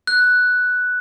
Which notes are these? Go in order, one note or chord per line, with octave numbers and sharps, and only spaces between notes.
F#6